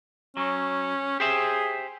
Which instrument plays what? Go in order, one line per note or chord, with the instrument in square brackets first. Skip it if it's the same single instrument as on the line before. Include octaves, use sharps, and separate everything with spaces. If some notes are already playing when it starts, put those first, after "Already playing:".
[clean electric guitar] F#3 [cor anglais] C#4
[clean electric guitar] G4 C5 E5 [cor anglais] G#4